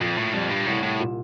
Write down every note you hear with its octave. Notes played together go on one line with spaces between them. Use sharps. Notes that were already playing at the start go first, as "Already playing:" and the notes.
F2 A#2
A2
F2 G3
G2
C2 A2
A2
A#2